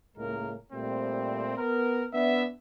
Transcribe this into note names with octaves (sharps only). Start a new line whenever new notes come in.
C#2 A2 G#3 A#3 A#4
A#2 G3 A3 C4
B3 A#4
B3 D4 E5